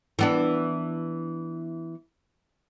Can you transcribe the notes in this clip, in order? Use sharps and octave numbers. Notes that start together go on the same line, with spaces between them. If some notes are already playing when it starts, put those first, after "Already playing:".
E3 B3 D4